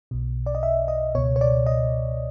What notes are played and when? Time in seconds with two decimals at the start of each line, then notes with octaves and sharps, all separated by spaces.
0.11 B1 B2
0.46 D5
0.55 D#5
0.63 E5
0.88 D#5
1.15 C#2 B2 C#5
1.36 C#5
1.41 D5
1.66 D#5